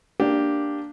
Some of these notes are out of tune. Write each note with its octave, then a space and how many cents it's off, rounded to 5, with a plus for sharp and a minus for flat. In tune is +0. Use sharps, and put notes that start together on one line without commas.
A#3 +0 D4 +0 G4 +0